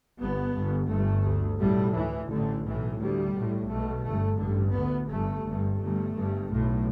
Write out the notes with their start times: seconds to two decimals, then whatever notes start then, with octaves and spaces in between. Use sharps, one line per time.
0.19 G1 G2 B3
0.54 G1 G2
0.88 G1 G2 A3
1.24 D2
1.59 B1 A2 G3
1.93 D2 E3
2.29 A1 A2 D3
2.64 B1 A2 E3
2.98 D2 G3
3.33 B1 A2
3.68 B1 B2 A3
4.03 G1 G2 A3
4.38 A1 G2 D3
4.72 D2 B3
5.08 G1 G2 A3
5.43 G1 G2
5.78 G1 G2 A3
6.13 G1 G2
6.47 B1 A2